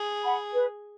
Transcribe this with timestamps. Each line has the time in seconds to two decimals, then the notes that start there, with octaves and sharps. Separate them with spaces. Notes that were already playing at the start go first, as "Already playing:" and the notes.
Already playing: G#4
0.23 F#5 B5
0.54 B4